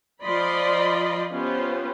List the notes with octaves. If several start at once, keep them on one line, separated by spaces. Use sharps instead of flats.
F3 D5 D#5 B5 C6
B3 C#4 F4 G4 B4 C5